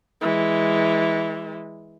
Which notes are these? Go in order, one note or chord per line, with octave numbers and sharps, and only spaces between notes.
E3 G#3